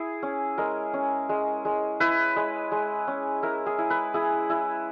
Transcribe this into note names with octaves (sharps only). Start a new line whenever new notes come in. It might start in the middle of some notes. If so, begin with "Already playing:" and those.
Already playing: E4 G#4
C#4
G#3 A#4
C#4
G#3
G#3
E4 B4
G#3
G#3
C#4
E4 A#4
G#4
E4
B4
E4 G#4
E4